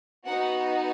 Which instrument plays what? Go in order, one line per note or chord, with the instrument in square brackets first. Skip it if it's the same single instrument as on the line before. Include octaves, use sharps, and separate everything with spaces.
[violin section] B3 D#4 F#4 F#5